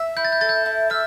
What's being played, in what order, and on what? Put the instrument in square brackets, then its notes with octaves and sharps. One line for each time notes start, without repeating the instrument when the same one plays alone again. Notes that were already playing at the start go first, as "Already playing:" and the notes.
Already playing: [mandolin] E5
[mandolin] E4 [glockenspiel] G6
[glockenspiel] A6
G6
[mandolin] A4 [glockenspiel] A6
[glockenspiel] G6
[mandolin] E4
[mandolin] E5 [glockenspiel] F6